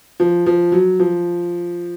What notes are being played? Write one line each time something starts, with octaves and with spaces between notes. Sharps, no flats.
F3
F3
F#3
F3